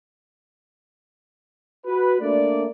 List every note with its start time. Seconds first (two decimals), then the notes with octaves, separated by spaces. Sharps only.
1.86 F#4 B4
2.21 A3 A#3 D4 D5